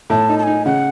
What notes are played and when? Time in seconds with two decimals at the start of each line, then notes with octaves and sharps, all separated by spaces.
0.10 A2 A5
0.29 D#4
0.38 A5
0.43 D#4 G#5
0.66 C#3 F#5